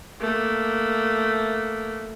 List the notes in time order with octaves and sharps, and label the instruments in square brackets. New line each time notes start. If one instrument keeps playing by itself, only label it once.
[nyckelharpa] A3 A#3